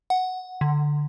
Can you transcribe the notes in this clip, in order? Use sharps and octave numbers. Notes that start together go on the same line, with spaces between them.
F#5
D3